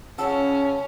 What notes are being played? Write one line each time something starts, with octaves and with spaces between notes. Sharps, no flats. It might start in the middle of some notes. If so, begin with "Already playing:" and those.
C#3 C#4 F4 F#5 A5 E6